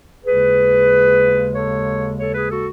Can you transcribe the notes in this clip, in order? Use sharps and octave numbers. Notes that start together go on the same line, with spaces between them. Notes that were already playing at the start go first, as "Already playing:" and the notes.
D#2 C#3 G#3 G#4 B4
A4 C#5
A4 C#5
G#4 B4
F#4 A4